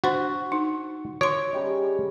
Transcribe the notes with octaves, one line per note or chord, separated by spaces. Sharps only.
D4 F#4 C5 C6
D#4
F#4 C#5 C6
C#3 G3 D#4